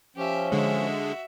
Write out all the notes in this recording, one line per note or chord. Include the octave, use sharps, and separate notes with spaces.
F3 C#4 G4 E5
D3 G#3 F#4 E5